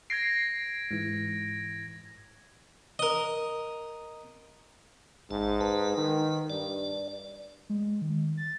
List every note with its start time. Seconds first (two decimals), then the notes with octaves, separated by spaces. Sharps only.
0.10 G#6 A#6 C7 D7
0.91 G#2 E3
2.99 A#4 D#5
5.31 A1 G#2 A5
5.61 B4
5.97 D#3
6.50 G2 D5
7.69 G#3
8.01 D#3
8.37 A6